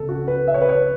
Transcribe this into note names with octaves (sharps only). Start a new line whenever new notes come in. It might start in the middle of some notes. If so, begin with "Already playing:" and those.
Already playing: C#2 C#3 B3 A4
F#4
B4
E5
C#5
B4
C#5